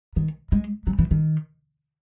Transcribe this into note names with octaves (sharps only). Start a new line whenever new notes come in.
D#3
G#3
F#3
E3
D#3